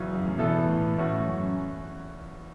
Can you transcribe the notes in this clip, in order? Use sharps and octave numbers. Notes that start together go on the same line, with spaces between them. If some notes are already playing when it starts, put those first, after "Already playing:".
Already playing: E2 C#3 E3 F#3 C#4
F#2
A2
E2 B2 E3 B3 E4 A4
A2
A2 E3 A3 C#4 F#4
F#2